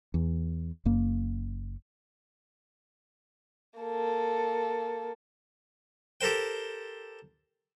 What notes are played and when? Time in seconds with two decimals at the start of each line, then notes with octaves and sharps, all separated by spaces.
0.14 E2
0.85 F#1 F#2 A#3
3.79 A#3 A4
6.21 G4 A4 A#4 C5 G5